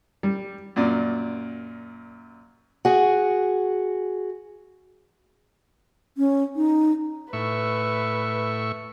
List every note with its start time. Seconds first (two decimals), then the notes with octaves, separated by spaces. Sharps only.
0.23 G3
0.76 F#2 A#2 D5
2.85 F#4 G#4
6.18 C#4
6.56 D#4
7.33 A2 B4 E5 C#6